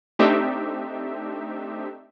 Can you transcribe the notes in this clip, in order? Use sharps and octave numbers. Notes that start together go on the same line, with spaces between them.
A3 C4 D4 D#4 G4 E5